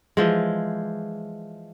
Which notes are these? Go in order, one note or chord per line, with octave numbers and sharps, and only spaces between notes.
E3 F3 G#3